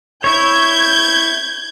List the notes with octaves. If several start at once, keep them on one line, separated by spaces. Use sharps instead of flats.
E4 C#5 G6 G#6